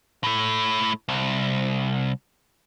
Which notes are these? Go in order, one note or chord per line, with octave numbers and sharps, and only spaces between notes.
A2 A3
C2